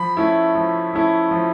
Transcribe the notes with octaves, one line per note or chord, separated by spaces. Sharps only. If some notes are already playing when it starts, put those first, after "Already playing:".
Already playing: F3 B5
A3 C#4 E4
F3
A3 C#4 E4
F3